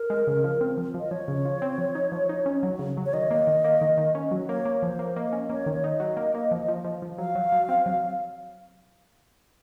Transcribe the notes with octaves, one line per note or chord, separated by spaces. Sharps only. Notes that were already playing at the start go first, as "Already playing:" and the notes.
Already playing: A#4
G#3
C#3
F3
C4
F3
F3 D#5
F3 C#5
C#3
F3
C4
F3
D#4
F3
D#4
C#4
F#3
C#3
F#3
C#5
D#3 D#5
A#3
D#3
A#3
D#3
D#3
C#4
F#3
A#3 C#5
A#3
F3 C5
A#3
A#3 D#5
C#4
A#3 C#5
D#3
C#5
D#4 D#5
F#3
A#3
A#3
F3
F3
F3
F3
F#3 F5
F#3
F#3
C4
F#3